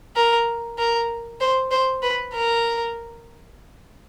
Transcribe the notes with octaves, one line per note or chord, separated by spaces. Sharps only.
A#4
A#4
C5
C5
B4
A#4